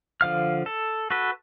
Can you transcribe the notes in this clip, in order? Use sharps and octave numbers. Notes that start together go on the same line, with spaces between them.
D3 F3 F5 F6
A4
F#4 A4 B4